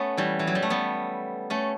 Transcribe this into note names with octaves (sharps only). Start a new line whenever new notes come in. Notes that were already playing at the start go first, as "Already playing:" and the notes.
Already playing: A3 B3 C#4
E3 G3
E3
F#3
G3
A3
G3 B3
A3 C#4